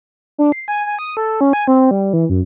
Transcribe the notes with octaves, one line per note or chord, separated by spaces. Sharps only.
D4
C7
G#5
G#5
D#6
A4
C#4
G#5
C4
G3
E3
F#2